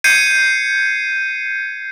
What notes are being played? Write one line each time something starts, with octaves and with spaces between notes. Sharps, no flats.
G6 G#6 C7 C#7 D#7